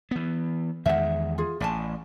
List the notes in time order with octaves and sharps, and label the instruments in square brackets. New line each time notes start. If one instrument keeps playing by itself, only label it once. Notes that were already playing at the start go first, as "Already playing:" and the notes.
[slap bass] E3 B3
[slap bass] E2 D#3 G#3 [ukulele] E5 F#5
[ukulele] F4 G#4
[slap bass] A1 [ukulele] D5 G#5 A5